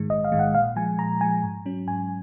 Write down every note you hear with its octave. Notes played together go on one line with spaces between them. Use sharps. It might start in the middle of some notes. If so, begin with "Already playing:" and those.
Already playing: G#2 D#3 G#3
A#1 D#5
F5
G#2 D#3 G#3
F#5
A#2 F5
F3 G#3 G#5
A#2 A#5
F3 G#3 G#5
G#2
F#3 C#4
G#2 G#5